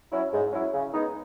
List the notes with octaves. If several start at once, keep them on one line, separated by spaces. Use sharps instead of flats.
F#3 C#4 E4
G#2
F#3 C#4 E4
C#3
G#3 B3 D#4